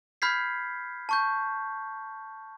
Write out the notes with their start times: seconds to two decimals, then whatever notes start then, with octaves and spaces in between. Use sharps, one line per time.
0.22 B5 F6 G6 G#6 B6 C7
1.09 A5 C#6 G6